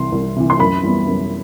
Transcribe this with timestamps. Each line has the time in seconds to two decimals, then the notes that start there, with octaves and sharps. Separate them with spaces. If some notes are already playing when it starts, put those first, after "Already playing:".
Already playing: C2 C3 E3 C6
0.12 C2
0.36 C3 E3
0.50 C6
0.59 F#2 B5
0.83 E3 G3 B3
1.07 F#2